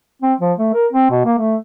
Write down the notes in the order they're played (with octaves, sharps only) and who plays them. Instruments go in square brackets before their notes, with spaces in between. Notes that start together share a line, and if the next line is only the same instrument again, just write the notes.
[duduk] C4
F3
A3
A#4
C4
B2
A#3
A3